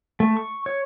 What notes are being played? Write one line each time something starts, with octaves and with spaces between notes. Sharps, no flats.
A3
C#6
C#5